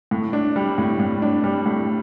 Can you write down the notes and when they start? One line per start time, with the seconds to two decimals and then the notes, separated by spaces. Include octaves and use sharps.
0.11 A2
0.33 D4
0.56 G3
0.78 A2
1.00 A2
1.22 D4
1.44 G3
1.66 A2